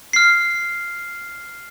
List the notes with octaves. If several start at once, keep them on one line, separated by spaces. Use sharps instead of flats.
F6 C7